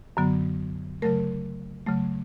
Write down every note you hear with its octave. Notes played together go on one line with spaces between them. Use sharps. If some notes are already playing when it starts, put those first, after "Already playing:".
F#2 D3 F#3 B3
C#3 F#3 A3 A#4
C#3 F#3 A3